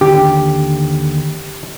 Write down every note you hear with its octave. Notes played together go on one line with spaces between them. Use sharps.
D#2 D3 G4